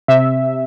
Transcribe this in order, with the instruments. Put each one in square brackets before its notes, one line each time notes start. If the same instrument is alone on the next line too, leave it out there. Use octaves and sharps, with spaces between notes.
[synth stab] C3 E5